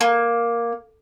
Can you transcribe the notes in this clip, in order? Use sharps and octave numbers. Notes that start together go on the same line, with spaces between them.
A#3